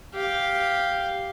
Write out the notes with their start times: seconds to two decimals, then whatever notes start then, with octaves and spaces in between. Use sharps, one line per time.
0.14 G4 F5